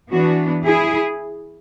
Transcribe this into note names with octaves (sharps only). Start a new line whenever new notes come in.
E3 B3 D4 F#4
E4 G#4